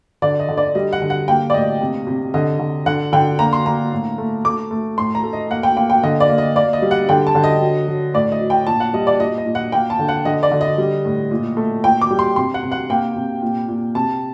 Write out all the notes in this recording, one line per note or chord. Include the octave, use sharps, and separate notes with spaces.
D3 D5
D#5
D3
D5
G3 D#5
F#5
D3
F#5
A#3 G5
D5
A2 D#5
C3
C3
D3 D#5
D3
D3 F#5
D3 G5
A#3 A#5
C6
A#3 A#5
A2
A3
A3 D6
A3
A2 C6
A#5
A3
D#5
A#3 F#5
G5
A#3 G5
G5
D3 D#5
D5
A#3
D#5
A#3 D5
D#5
G3
F#5
D3 G5
A5
D3
D#5
F#3
F#3
A2 D5
D#5
F#3
G5
A#2 A5
F#5
G3 D#5
D5
A#2 D#5
D#5
A#2
F#5
A#3 G5
A5
D3
F#5
D3 D#5
D5
D3
D#5
G3
A2
A#2
A3
A#2 G5
D6
G3
C6
C3 C6
F#5
C3
F#5
A#3 G5
C3
A#2
A#2
C3 A5